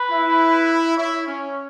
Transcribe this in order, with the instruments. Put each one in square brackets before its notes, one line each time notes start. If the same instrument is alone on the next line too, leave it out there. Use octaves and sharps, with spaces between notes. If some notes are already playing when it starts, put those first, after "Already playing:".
Already playing: [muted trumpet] B4
[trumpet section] E4
[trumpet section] E4 [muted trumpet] C#5
[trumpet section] C#4